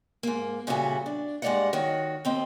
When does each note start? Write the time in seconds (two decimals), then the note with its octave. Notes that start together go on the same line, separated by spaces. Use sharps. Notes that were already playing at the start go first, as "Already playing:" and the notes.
0.23 G#2 A#3
0.67 A#2 C#3 G3 E4 F#4 A4
1.06 D4
1.42 G2 G#3 A#3 D5 D#5 F#5
1.73 D#3 F#4 C#5
2.25 D#2 C4 D#5